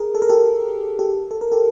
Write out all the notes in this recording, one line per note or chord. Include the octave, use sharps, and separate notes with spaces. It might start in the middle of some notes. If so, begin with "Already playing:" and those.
Already playing: G#4 A#4
A4
A#4
G4 A4
G4 A4
A4
A#4
G4 A4